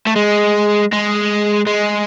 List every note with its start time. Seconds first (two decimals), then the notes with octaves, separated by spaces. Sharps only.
0.07 A3
0.16 G#3
0.93 G#3
1.67 G#3